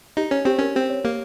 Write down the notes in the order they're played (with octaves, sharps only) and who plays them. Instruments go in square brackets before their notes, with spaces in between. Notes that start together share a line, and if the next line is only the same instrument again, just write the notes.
[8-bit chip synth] D#4 [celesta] G4
[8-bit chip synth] C#4 [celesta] C#5
[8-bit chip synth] C4 [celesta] G4
[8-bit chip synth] C#4 [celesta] A#4
[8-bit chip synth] C4 [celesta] G4
[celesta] C#5
[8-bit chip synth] A#3 [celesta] G4